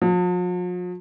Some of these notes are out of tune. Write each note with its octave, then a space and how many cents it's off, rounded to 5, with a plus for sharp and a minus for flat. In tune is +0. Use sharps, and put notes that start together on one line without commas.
F3 +45